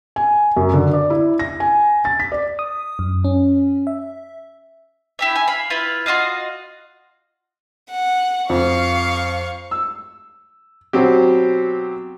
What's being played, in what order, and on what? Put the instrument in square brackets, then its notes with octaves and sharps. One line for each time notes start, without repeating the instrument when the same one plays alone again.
[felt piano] G#5
F#2
D3
D5
E4
A#6
G#5
A6
B6
D5
[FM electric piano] D#6
F#2
C#4
E5
[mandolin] E4 G4 E5
G#5
F5 B5
E4 F4 B4
F4 F#4 D#5 F5
[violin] F#5
[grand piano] F2 [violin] F5 C#6
[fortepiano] E6
B2 F#3 C4 G4